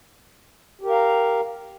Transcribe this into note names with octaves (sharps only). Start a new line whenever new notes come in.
G4 A#4 F5 A#5